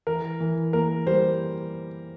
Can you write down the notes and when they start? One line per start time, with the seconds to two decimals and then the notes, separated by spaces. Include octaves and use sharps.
0.07 E3 A#4
0.40 E3
0.73 A#3 A#4
1.07 G3 C5